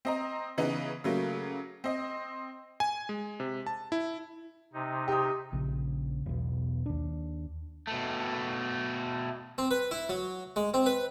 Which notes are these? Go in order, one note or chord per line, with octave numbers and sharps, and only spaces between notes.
C4 D#5 A#5
C#3 E3 B3 D#4
C#3 F#3 A3 A#3
C4 D#5
G#5
G#3
C3
A5
E4
C3 D#4
G4 D#6
A#1 C#3
E1 B1
D#2 D4
B2 A3
C4
B4
E4
F#3
G#3
C4
B4